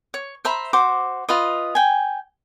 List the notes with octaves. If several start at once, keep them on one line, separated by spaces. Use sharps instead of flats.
C#5
C5 E5 A#5 B5
F#4 C5 D6
F4 B4 D#5
G5 G#5